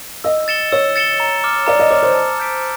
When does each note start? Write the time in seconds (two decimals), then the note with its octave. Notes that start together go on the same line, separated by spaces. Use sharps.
0.24 D#5 E6
0.48 A6 C#7 E7 G7
0.72 C#5 E6
0.96 A6 C#7 E7 G7
1.20 A#5
1.44 D6 F6
1.66 D5 A#5
1.79 D#5
1.91 C#5 D6 F6
2.03 C5
2.14 A5
2.38 D6 G6 B6 D7